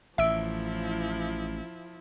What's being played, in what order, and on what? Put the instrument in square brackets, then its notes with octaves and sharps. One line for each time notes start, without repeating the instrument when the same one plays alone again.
[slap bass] A1 A2 [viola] F3 E4 [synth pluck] E5 E6 D7